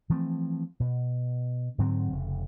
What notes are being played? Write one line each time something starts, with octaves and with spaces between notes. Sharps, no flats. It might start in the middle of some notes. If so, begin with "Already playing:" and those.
E3 F3 A3 C4
B2
G#2 D3 F#3 C4
F1 C#3